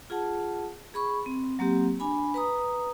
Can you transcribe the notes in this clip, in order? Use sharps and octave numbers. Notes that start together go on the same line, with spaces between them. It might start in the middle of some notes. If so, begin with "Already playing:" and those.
F4 G#4 F#5 A5
G#4 B5 C#6
C4
F#3 A#3 C4 G4
D4 G#5 B5
B4 A#5 D#6